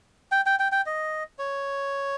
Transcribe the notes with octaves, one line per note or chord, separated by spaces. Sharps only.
G5
G5
G5
G5
D#5
C#5